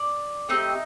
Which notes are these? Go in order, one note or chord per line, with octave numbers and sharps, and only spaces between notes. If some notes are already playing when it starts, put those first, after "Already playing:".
Already playing: D5
A3 C4 D#4 G4 D#5